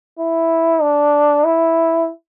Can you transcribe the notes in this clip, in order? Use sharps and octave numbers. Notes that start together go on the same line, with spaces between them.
E4
D4
E4